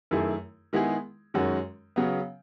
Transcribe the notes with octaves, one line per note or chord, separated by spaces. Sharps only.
F#2 D#3 A3 E4 G#4
D#3 G#3 B3 E4 G#4
F#2 D#3 G#3 C#4 F#4
C#3 F#3 B3